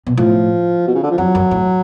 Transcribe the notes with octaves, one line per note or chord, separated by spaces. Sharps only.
B2
A2 F3
B2
C#3
D3
F3
F2 F#3
F#2
A2